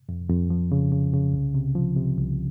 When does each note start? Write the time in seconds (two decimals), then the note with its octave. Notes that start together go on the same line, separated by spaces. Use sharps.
0.09 F2
0.30 F2
0.50 F3
0.72 C#3
0.92 C#3
1.13 C#3
1.34 C2
1.54 C3
1.75 F3
1.96 C3
2.17 C2